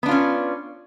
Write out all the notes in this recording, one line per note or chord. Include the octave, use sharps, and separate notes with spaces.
B3 C#4 D4 F4